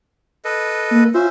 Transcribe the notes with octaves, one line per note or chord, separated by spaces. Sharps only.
A4 B4 D#5
A#3
C#4 F4 C5 E5